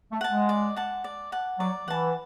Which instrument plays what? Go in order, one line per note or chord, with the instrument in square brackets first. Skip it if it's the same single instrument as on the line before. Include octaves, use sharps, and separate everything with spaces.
[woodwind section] A3
[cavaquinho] F#5 A5
[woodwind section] G#3
[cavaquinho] D5
F#5 A5
D5
F#5 A5
[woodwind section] F#3 [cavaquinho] D5
[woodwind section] E3 [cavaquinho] F#5 A5